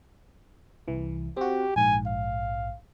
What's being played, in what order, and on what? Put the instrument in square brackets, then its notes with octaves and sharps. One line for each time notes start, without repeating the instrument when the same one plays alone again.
[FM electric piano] C2 E3
[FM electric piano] C4 F#4 [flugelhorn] G4
[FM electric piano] A#1 G#2 [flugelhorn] G#5
[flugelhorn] F5